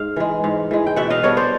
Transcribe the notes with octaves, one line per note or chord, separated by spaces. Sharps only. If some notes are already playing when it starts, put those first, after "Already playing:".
Already playing: G#2 F5
E3 G#3
G#2
E3 G#3
G5
B2 E5 F#5
D#5 F5
G3 B3 D4 C#5 D#5
C5 D5